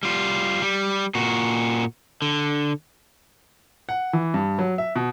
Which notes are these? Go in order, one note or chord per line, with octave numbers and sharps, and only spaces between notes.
G3 F4
G3
A#2 F#4
D3
F#5
E3
G2
F#3
E5
B2